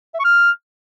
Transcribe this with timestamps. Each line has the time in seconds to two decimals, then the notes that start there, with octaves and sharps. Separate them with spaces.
0.14 E5
0.19 C#6
0.24 F6